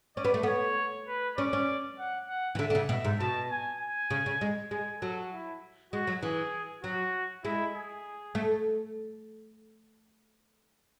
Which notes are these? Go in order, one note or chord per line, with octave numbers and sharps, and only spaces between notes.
C#4 D5
B3
A3
B3 C#5
B4
C#4 D5
C#4
F#5
F#5
E3
D3 E5
D3
C#3
B2 E5
G#2
B2 A5
G#5
G#5
C#3
C#3
G#3
G#3 G#5
F#3 A4
E4
G#3 F#4
F#3
E3 G#4
F#3 F#4
G#3 E4
G#4
A3